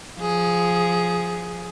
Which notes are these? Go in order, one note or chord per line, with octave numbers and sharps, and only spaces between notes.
F3 G#4